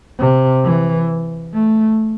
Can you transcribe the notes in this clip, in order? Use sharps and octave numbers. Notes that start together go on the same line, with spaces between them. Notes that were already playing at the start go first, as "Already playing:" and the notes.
C3
E3
A3